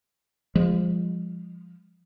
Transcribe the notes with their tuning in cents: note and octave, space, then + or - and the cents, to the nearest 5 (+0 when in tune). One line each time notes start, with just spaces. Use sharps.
F3 +0 G#3 -30